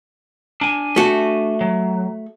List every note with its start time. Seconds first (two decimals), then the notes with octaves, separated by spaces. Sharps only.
0.61 D4 G#5
0.96 A3 F#4
1.61 F#3